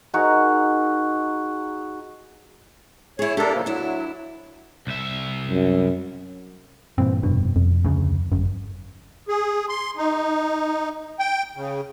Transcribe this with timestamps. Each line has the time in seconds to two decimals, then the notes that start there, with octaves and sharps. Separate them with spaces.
0.14 D#4 F#4 G#4 A#4
3.19 E4 G#4 C#5
3.37 D4 G4 A4 A#4
3.53 C#3 F3 A#3
3.66 F#3 D4 E4
4.87 C2 E5
5.49 F#2
6.98 G2 A#2 E3 C4
7.23 F1 G2 B2
7.56 F2
7.85 D2 C#3
8.32 G1 F#2
9.28 G#4
9.69 C6
9.97 D#4
11.19 G5
11.56 C#3